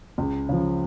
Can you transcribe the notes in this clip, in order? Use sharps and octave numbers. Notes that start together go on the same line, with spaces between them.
C#2
C#3 F3